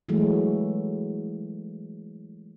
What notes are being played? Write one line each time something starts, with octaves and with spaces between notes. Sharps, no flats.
E3 F#3 G#3 A3